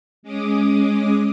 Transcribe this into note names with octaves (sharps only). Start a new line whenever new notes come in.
G#3 C#4 D6 D#6